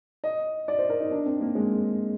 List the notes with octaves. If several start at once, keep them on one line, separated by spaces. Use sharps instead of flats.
D#5
D5
C5
A#4
D#4
D4
C4
A#3
G#3